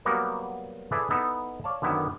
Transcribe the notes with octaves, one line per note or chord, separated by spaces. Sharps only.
F#3 G3 A#3 B3 F#4 A#4
E4 G#4 A4 B4 D5 E5
B3 D#4 E4 A4
C#5 D5 F5 A5
F#2 D3 D#3 B3 E4